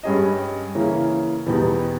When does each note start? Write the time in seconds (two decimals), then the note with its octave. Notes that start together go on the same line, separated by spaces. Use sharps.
0.03 G2 G3 C#4 G#4 D#5
0.75 C#3 E3 A#3 C#4
1.46 E2 B2 G3 B3 D#4